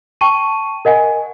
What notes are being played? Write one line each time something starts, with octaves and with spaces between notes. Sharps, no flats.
G5 A5 C#6 D#7
A#4 D#5 F#5 G#5